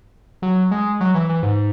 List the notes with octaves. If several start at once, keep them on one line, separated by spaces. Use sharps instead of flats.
F#3
G#3
F#3
E3
E3
G#2